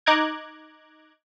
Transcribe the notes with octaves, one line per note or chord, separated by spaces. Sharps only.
D#4 A#5 D6 F#6 G#6